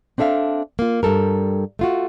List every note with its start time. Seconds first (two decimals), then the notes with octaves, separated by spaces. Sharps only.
0.18 C4 D4 A4 E5 F5
0.79 A#3 F4
1.03 G2 G3 A4 A#4
1.79 A3 F4 F#4